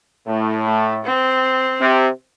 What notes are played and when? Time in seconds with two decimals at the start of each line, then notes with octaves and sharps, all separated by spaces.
0.27 A2 A3
0.66 A3
1.04 C4
1.81 C3